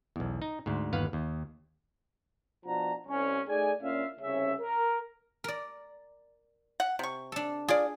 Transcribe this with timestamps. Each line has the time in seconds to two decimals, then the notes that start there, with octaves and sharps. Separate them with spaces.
0.16 B1 E2
0.42 D#4
0.66 D2 G#2
0.93 G1 D#2 B4 F5 F#5
1.13 D#2
2.65 B2 F3 D4 F#4 A5 A#5
3.07 C2 C#4
3.47 A3 D#4 G#4 D5 G#5
3.82 A#2 C#4 D4 F4 E5 F5
4.19 C2 C#3 C#4 C#5 E5
4.60 A#4
5.44 A#4 D5
6.80 F#5
6.99 C3 C#6
7.32 D4 A4
7.68 F4 G#4 D5